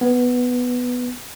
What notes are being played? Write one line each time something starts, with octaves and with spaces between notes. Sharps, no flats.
B3